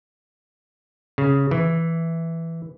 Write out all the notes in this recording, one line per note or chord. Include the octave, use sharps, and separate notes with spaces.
C#3
E3